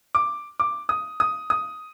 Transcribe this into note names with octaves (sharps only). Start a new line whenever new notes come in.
D6
D6
D#6
D#6
D#6